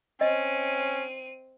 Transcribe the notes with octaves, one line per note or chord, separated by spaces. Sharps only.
C4 C#4 D#5 D#7